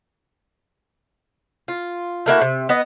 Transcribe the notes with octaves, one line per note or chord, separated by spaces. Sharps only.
F4
A3 A#3 E4 F#4
C3
B3 D#5